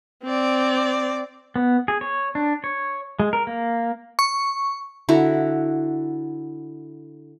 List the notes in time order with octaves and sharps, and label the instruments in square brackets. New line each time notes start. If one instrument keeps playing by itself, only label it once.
[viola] C4 D5
[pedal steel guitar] B3
G#4
C#5
D4
C#5
G#3
A#4
A#3
[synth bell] C#6
[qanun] D3 E4 F#4 A#5